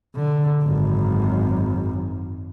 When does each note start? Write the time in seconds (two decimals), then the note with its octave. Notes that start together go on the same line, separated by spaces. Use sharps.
0.16 D3
0.64 G#1 F#2